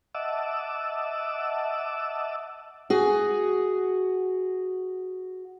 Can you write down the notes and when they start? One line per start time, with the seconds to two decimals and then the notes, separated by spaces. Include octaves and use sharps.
0.15 D#5 E5 F#5 A5 D6 E6
2.90 F#4 G#4